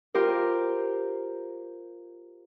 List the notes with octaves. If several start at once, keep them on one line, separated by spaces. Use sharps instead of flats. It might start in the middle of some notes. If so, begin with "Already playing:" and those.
F4 G4 A#4 C5